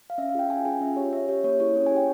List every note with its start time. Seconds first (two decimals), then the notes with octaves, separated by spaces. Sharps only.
0.10 F5
0.18 C#4 E5
0.29 F5
0.35 F4 G#4 G5
0.49 C#4 G#5
0.65 F4 G#4 G#5
0.81 C#4 E5
0.96 G4 C#5
1.13 C#4 E5
1.29 G4 C#5
1.44 A#3 C#5
1.60 E4 G#4 C#5
1.76 C#4
1.86 G#5
1.92 G4 G5